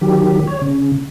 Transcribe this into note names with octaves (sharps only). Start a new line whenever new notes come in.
D#3 F#3 G4
C#5
C#3